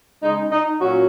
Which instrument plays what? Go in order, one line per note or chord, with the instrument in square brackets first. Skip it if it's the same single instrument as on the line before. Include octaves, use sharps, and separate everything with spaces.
[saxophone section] C#3 G#3 D#4
D#4
A#2 F#3 A#3 C#4 F#4